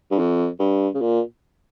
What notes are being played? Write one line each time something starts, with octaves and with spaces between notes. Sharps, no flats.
G2
F2
G2
C#3
A#2